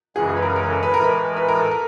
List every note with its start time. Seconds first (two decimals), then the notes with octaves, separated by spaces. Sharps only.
0.16 F#2 C#3 E3 G#3 C#4 G#4
0.29 G#4
0.36 B4
0.42 A#4
0.56 A#4
0.70 A4
0.83 B4
0.94 A2 E3 G#3 A#4
1.04 B4
1.36 B4
1.48 A#4
1.60 A4
1.71 A#4